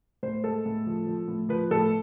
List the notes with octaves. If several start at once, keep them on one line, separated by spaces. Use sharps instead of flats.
A2 C5
G#3 A4
A2
F3
F3
A2
F3 B4
A2 A4